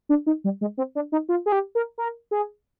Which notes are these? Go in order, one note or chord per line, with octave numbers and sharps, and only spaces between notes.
D4
D#4
G3
G#3
C4
D4
D#4
F4
G#4
G4
A#4
A#4
G#4